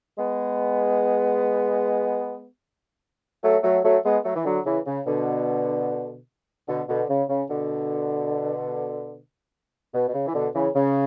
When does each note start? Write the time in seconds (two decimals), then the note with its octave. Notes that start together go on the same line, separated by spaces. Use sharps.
0.18 G#3 B3
3.43 F#3 A3
3.63 F#3 A3
3.84 F#3 A3
4.04 G#3 B3
4.25 F#3 A3
4.36 E3
4.45 D3 F#3
4.65 C#3 E3
4.86 C#3
5.06 B2 D3
6.68 B2 D3
6.89 B2 D3
7.10 C#3
7.29 C#3
7.49 B2 D3
9.94 B2
10.08 B2
10.14 C#3
10.27 E3
10.34 B2 D3
10.54 C#3 E3
10.75 C#3